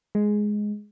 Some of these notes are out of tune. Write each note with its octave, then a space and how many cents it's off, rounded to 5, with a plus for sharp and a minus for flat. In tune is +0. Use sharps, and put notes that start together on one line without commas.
G#3 +5